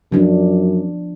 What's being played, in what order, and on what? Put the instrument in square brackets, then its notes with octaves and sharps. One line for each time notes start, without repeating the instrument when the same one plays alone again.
[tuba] F#2 [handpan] F3 B3 D4